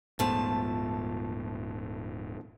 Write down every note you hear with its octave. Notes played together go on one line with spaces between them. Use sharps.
D#1 G#2 F3 A3 B3 A5